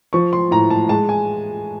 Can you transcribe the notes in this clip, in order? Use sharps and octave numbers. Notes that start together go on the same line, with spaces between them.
F3 C#6
C6
A2 A#5
A5
G#3 A5
G#5